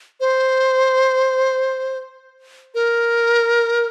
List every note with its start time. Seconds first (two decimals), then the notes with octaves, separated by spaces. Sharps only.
0.20 C5
2.75 A#4